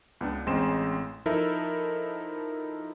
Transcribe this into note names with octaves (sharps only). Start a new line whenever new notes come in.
C#2 B3 D4
A1 G#3 C4 C#4 C6 E7
F3 D#4 E4 A4 A#4 E5